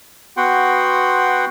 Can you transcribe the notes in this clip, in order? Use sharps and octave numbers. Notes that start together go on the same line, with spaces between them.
B3 F#4 F#5 G5 C6